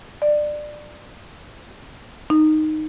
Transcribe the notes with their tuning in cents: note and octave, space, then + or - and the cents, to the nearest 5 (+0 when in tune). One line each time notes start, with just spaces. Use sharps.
D5 +20
D#4 -5